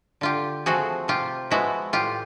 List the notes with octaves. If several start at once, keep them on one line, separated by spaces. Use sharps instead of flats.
D3 F4 G4
F3 A3 C4 F#4 G#4
C3 F4 G4
F3 G#3 B3 E4 F#4
A2 F4 G4